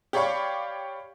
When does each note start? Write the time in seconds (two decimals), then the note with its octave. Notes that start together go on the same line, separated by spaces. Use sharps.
0.13 G4 C#5 D5 F5 B5 C#6